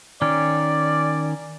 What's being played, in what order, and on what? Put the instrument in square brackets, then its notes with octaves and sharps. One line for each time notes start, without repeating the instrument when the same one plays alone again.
[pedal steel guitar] D#3 C#4 [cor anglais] D5